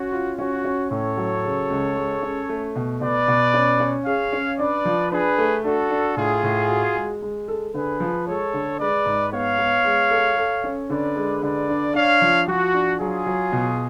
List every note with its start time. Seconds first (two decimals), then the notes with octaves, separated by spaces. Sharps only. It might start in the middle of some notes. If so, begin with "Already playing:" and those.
Already playing: C#4 F#4
0.12 F4
0.38 C#4 F#4
0.64 C#4
0.91 A2 A4 C#5
1.17 F#3
1.44 C#3
1.70 C#2
1.96 G#3
2.22 C#4
2.49 A3
2.75 B2
3.01 B2 B4 D5
3.28 B2
3.54 C#4
3.80 C#4
4.06 G#4 C#5 F5
4.33 C#4
4.59 D4 B4 D5
4.85 F3
5.11 D4 G#4 B4
5.38 A3
5.64 D4 F#4 A4
5.90 D4
6.17 A2 F4 G#4
6.43 A2
6.69 F#4
6.96 G#3
7.22 G#3
7.48 A4
7.74 D3 G#4 B4
8.00 F3
8.27 G#3 A4 C#5
8.54 D3
8.79 G#3 B4 D5
9.06 G#2
9.31 B3 C#5 F5
9.58 B3
9.85 G#3
10.11 A4
10.37 A4
10.64 C#4
10.89 D3 B4 D5
11.16 G#3
11.42 D3 B4 D5
11.69 D4
11.94 D4 C#5 F5
12.22 F3
12.47 F3 F#4
12.74 D4
12.99 F#3 F4 G#4
13.26 F#3
13.52 B2